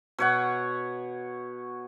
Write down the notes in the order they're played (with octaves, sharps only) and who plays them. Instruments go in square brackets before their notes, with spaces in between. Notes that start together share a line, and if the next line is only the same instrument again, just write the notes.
[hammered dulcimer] B2 C#5 F#5